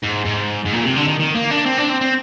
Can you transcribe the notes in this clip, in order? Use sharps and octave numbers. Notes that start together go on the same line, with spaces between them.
G#2
G#2
G#2
A#2
C3
D3
D#3
D#3
A#3
D4
C4
D4
C4
C4